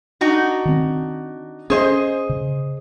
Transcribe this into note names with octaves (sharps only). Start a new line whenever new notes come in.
D4 D#4 F#4
D#3 C4
C#4 G#4 C5 D#5
C#3